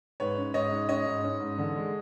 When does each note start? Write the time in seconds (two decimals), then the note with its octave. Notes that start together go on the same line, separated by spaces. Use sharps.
0.20 G#2 B4 C#5
0.38 C#4
0.54 G#2 C#5 D#5
0.72 G#2
0.89 C#4 C#5 D#5
1.06 G#2
1.24 C#4
1.40 G#2
1.58 D3
1.76 G#3